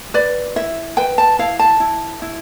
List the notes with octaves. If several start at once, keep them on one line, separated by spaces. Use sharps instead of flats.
B4 D5
E4 E5
B4 G5
A5
E4 F5
A5
E4
E4